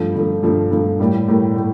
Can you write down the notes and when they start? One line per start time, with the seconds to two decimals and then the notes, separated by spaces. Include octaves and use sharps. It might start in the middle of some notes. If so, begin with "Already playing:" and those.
Already playing: G2 F3 A3
0.15 G2 F3 A3
0.43 G2 F3 A3
0.71 G2 F3 A3
1.00 A2 G3 A#3
1.28 A2 G3 A#3
1.56 A2